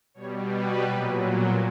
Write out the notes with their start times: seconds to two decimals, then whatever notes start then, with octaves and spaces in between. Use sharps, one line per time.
0.14 B2 G3 C#5
0.49 B4
0.83 A#2 F#3